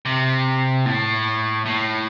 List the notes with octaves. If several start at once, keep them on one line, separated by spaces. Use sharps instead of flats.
C3
A2
A2